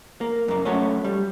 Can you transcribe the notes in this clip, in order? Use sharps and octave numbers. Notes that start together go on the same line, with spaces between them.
A#3
F#2 A#3
F#3 A3 C#4
G3